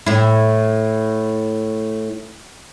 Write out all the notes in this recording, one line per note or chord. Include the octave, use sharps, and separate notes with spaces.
A2 E4